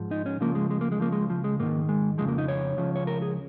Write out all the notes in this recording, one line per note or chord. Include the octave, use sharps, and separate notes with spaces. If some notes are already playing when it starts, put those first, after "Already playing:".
Already playing: G#2 F3
D#4
C#4
C#2 C#3 F3 A#3
G#3
G#3
A#3
G#3
C#2 C#3 F3 A#3
G#3
F3
G#3
G#2 D#3 A#3
G#3
F2 C#3 F3 G#3
A#3
D#4
C#5
C#2 C#3 F3
C#5
A#4
G#4